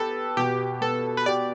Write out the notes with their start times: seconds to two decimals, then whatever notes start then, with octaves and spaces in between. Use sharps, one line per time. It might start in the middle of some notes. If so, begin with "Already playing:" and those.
Already playing: B3 G4 A4 B4
0.37 B2 G4
0.81 B3 A4
1.17 B4
1.26 G4 D5